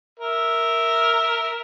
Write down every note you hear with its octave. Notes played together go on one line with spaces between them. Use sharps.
A#4 E5